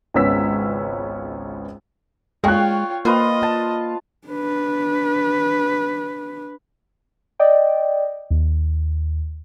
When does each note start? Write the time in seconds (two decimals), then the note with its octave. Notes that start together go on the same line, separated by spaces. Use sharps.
0.14 G#1 C#2 B3 C#4 E6 B6
2.44 G#3 F4 C#5 F5 G5 C#6 F#6
3.05 A#3 F4 B4 C5 D#5
3.43 A5
4.28 D4 B4
7.39 D5 D#5 G5
8.30 D#2